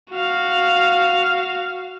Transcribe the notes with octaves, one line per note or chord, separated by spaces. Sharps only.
F#4 F5